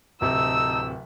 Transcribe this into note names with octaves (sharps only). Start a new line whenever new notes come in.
D1 C3 D#4 A4 E6